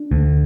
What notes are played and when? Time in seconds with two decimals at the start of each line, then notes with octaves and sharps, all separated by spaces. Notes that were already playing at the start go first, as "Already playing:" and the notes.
Already playing: D4
0.11 D2